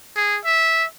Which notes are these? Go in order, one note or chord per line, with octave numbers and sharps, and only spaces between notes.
G#4
E5